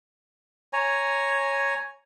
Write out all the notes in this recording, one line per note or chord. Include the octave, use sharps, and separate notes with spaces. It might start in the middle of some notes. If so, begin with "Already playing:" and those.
C#5 G#5 A#5